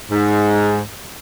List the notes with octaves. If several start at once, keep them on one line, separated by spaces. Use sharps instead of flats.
G#2